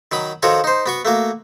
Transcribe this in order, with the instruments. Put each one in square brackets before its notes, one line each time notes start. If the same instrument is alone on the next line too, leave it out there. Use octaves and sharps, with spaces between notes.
[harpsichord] D#3 F#3 B5 D#6
D#3 F3 F#4 A4 C#5 A#5
D#4 C5
B3 F#4 C#6
A3 A#3 F#4